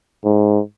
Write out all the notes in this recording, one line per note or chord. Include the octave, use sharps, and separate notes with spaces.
G#2